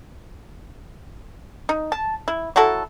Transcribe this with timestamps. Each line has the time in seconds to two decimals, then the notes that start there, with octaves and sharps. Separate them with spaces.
1.69 D#4
1.92 A5
2.28 E4
2.56 F#3 E4 F#4 A4